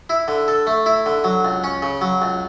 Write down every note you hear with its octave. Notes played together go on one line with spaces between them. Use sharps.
E4
D3
A4
A3
E4
D3
F#3
C#2
C#4
C#3
F#3
C#2